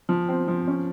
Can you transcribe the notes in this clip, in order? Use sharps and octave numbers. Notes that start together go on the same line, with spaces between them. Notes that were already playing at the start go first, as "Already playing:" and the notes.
F3
C4
F3
C#4